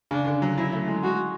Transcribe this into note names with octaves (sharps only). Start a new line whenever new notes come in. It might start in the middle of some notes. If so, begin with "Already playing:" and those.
C#3 D4
D3
F#3
F#3 E4
A3
G#3
G#3 F#4